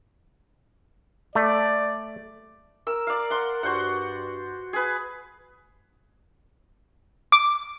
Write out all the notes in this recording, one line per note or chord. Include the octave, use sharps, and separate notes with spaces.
A3 D5
A#4 E6
D5 F5
F#5 C6
G2 F#4 C5 F#5
G#4 B4
D6